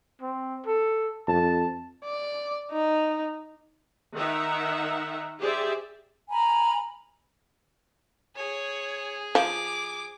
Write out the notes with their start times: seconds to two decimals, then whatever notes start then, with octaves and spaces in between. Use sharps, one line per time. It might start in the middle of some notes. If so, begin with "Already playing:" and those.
0.22 C4
0.66 A4
1.28 F2 A5
2.04 D5
2.71 D#4
4.15 D#3 D#4 A#4 E5 F#5
5.40 G4 G#4 C5 D5 E5
6.30 G#5 A#5 B5
8.36 G#4 C#5
9.35 F3 D6